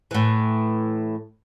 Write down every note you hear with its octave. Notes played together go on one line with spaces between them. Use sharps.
A2 E3